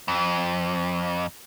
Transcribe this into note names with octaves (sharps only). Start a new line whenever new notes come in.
F2